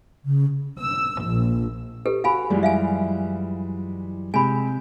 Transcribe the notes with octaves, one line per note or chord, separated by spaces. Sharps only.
C#3
E6
A#1
G4 A4 B4
F#4 F5 G#5 B5
F#2 E3 G3 G#3 F4
E5 F5 G#5
C3 G#3 C4 G4 G#5 B5